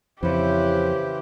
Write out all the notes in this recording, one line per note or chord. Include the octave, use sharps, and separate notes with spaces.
F2 C#3 E3 E4 G4 B4 C5